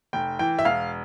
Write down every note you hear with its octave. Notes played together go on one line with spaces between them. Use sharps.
F1 G5
E3 G5
E5
E1 F5